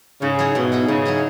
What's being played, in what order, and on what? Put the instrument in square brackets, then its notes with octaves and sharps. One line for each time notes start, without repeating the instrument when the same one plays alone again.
[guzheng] G#2 [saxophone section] C#3
[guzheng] F#3 E4 G#4
[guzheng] G#2 [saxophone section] B2
[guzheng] F#3 E4 G#4
[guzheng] G#2 [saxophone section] C#3
[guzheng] F#3 E4 G#4